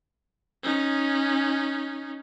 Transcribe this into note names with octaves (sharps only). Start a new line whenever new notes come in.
C#4 D#4